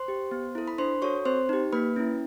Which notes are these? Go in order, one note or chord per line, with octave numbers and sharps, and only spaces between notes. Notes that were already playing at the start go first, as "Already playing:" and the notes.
Already playing: C5 C6
G4
B3
E4 A4
B5
D4 C5 C6
F#4 A4 C#5 C#6
C4 C5 C6
D#4 G4
A#3 B4 B5
C#4 E4